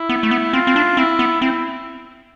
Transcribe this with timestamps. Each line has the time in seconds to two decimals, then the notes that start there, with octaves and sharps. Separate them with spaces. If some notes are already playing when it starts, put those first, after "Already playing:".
Already playing: E4
0.09 B3
0.23 A3
0.31 B3
0.53 C4 F4
0.67 C4
0.76 D4
0.97 C4 E4
1.19 B3
1.41 C4 E4